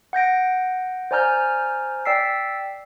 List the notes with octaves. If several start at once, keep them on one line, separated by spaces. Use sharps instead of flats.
F#5 G6 A#6 D7
C5 D5 G#5 A#5 F6 G6
D5 G5 E6 B6 C7